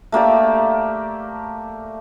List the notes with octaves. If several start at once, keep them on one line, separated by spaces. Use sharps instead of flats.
A3 A#3 G4 D5